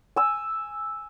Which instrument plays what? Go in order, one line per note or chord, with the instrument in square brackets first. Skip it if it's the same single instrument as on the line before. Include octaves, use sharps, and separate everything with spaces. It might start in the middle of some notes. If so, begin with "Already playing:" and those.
[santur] G#5 E6